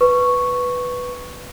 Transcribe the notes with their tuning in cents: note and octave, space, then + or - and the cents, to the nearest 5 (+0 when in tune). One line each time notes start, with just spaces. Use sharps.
B4 +0 C#6 +0